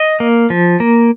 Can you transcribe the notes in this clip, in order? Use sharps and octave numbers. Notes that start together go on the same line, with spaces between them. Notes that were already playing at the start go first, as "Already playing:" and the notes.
Already playing: D#5
A#3
F3
A#3